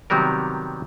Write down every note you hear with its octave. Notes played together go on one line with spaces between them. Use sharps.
C3 D#3 F#3 G3 B3 A#4